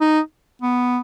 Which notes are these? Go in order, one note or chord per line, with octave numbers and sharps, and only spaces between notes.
D#4
B3